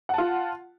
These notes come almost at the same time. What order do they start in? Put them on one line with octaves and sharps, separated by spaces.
F#5 A5 F4